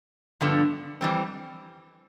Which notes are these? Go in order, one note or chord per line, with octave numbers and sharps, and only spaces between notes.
G2 D3 F3 B3
F2 E3 G3 C4